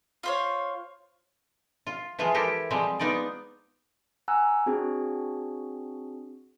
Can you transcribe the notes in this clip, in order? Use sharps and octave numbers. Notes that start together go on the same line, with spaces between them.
F4 C5 C#5
F4
E3 F3 G#3 F4
E4 G4 A4 A#4
F3 G3 G#3 C4
B3 D#4 F4 D5
F#5 G#5 A#5 E6 F#6
C4 D4 F#4 G#4